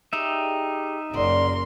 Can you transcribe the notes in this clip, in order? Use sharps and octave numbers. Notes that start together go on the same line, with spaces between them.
G3 D#4 G4 G#4 E5
F#1 C#3 F#4 A#4 D5 C6